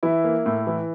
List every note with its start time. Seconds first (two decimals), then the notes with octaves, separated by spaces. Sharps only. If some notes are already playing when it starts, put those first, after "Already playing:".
0.03 E3 E4
0.24 A#3
0.46 A2
0.67 E3